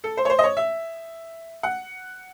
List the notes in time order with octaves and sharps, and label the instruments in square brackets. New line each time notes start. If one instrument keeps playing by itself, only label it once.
[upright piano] A4
C5
C#5
C5
D#5
C#5
E5
F#5